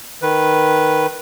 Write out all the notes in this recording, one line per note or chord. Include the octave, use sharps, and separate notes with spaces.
D#3 B4